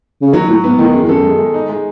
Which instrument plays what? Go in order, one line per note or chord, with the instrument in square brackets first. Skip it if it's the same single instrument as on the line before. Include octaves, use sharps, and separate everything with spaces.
[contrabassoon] C#3
[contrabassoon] D#3 [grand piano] F#3
[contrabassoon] A2 [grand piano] F#3
[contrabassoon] G#2 [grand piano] B3
[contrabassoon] A2 [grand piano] D#3
[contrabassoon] F#2 [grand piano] G#3
[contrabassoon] E2
[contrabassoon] F#2 [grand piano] A4
[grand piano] G#3
G#3
D#4
G#3